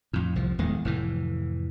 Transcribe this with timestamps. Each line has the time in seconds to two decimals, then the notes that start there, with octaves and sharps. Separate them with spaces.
0.13 F2 A2
0.36 C2 F3
0.58 D1 E2 D#3 G#3
0.85 F1 A2 E3